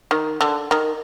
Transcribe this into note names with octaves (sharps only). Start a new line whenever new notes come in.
D#3
D3
D#3